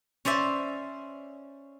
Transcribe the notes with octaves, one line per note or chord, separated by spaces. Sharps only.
C#4 C5 D5 E5